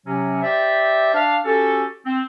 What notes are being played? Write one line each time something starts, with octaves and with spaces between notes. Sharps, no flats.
C3 F#3 C#4
G4 C5 D5 E5
D4 F5
C#4 F#4 G4 A4
C4